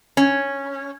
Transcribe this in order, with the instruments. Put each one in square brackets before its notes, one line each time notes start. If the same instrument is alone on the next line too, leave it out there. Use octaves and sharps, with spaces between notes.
[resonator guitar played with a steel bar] C#4